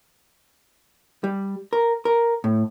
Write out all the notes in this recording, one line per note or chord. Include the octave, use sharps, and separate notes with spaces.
G3
A#4
A#4
A2